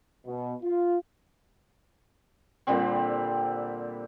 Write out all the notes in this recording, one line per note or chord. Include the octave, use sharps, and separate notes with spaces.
B2
F4
A#2 D3 G3 C4